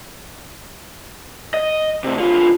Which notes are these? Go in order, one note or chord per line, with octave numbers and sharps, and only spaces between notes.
D#5
A2 C3
D3 F4